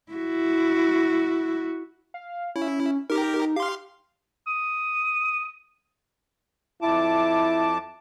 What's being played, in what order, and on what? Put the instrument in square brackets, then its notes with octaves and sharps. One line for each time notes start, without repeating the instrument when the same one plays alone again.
[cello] E4 F#4
[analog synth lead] F5
[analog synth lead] C#4 [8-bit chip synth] E4
[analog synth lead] D#4 [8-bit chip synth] G4 A#4
[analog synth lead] G4 [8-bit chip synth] F5 C6
[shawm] D#6
[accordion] F2 A5 D6 [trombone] E4